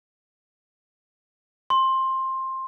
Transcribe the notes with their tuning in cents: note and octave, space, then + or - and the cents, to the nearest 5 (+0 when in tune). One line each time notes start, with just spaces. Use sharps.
C6 +15